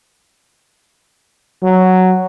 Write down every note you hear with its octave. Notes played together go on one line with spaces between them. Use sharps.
F#3